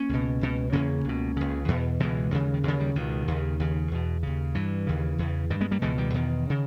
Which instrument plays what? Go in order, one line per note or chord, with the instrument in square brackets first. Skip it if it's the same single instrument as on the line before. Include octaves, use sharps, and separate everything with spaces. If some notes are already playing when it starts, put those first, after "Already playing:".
Already playing: [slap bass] A#3 C#4
C#2 B2
C#2 B2
E2 C#3 A#3 C#4
C#2 B2
C#2 C#3
E2 B2
C#2 B2 E3 G#3
D#2 C#3
D#3
D#2 C#3 E3
D#3 G3
C#2 B2 D#3
D#2 C#3
D#2 C#3
E2 B2
D#2 C#3
G2 E3
D#2 C#3
E2 C#3
G2 D#3 G3
G#3 B3
G3 A#3
C#2 B2 E3 G#3
D#3 G3
E2 B2 D#3
C#3